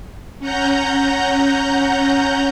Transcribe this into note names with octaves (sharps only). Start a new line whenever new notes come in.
C#4 F#5 A#5 G6